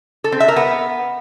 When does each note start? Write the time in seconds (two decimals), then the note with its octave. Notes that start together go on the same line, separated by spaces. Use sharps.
0.24 A4
0.32 C4
0.40 E5
0.48 A#4
0.56 B3